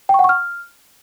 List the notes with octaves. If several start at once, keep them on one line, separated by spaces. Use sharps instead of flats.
G5
C#6
F#5
C#6
F6